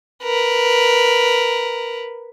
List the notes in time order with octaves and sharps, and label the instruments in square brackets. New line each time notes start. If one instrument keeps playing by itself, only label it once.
[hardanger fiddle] A#4 B4